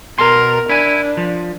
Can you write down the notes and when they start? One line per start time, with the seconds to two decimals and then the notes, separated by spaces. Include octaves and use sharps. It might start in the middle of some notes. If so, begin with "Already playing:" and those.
0.18 B2 A#4 C6
0.70 D4 E4 G#5
1.17 F3